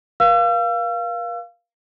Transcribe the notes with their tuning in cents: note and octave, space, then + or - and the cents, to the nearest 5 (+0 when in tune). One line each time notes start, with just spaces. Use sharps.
A#4 +45 F5 +0 E6 +40